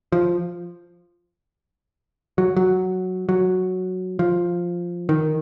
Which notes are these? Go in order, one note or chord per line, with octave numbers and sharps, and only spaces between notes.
F3
F#3
F#3
F#3
F3
D#3